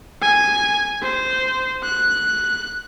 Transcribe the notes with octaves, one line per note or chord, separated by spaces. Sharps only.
G#5
C5
F#6